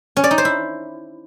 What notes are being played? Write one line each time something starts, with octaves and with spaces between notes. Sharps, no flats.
C#4
D5
D#4
C5
E4